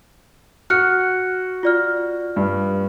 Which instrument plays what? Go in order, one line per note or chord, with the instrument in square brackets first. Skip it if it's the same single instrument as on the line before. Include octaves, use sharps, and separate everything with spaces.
[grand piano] F#4 [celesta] F6 F#6 C#7
[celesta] F4 D5 F6
[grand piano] G2